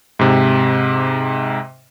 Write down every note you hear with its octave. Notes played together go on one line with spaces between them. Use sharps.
G#2 C3